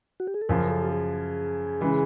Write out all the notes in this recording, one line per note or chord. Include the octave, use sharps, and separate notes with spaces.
F#4
G4
G#4
A4
F#2 C#3 F3 A#4
A4
G4
G#4
C#3 E3 G#3